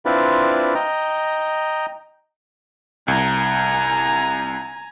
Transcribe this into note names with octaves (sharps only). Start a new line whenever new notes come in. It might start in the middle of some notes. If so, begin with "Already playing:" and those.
C4 D4 E4 F4 B4 D5
D#5 G5 A#5
C2 G#5 A#5